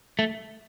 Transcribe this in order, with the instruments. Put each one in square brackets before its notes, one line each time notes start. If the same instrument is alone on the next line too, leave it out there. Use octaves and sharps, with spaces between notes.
[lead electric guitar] A3